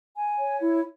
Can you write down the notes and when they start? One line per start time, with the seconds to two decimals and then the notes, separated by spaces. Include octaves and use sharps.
0.16 G#5
0.38 C#5
0.60 E4